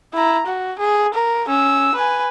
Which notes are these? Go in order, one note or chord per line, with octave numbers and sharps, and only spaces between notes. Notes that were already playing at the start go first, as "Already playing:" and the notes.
E4 A#5
F#4
G#4
A#4
C#4 E6
B4 G#5